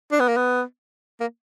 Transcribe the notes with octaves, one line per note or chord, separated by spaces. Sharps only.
D4
B3
A#3
B3
A#3